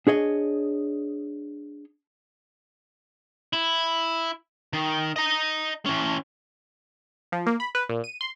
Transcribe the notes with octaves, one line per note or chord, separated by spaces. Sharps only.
D4 G#4 C#5 D#5
E4
D#3
D#5 A#5
E3 C#4
F3
A#3
B5
B4
A#2
D#7
C6